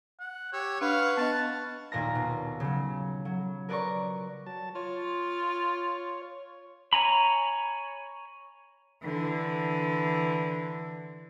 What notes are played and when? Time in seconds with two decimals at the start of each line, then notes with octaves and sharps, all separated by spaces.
0.20 F#5
0.53 G4 C#5 E6
0.81 D4 B4 F5 F#5 C#6
1.17 B3 D4 D#5 A5
1.92 D#2 A#2 A#4 F5 A#5 A#6
2.15 B2
2.60 C#3 F#3
3.25 F#3
3.69 A#4 B4 D5 A#5 C#6
4.46 F#3 A5
4.75 F4 C#5
6.93 C#5 G#5 A#5 B5
9.03 D3 E3